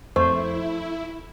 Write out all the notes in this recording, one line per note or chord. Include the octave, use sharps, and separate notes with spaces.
F2 A3 E4 C5